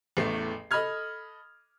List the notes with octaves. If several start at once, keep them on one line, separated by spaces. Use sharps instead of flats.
A1 E2 A2 A3 C7
A4 D#5 B5 D#6 F6 G#6